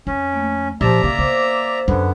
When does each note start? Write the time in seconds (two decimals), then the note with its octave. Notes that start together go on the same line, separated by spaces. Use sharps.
0.07 F2 C#4
0.33 A3 A#3
0.81 A#2 F3 G4 D5 E5 A#5
1.04 C#3 A#3
1.19 B3 C5
1.88 F#2 D3 B3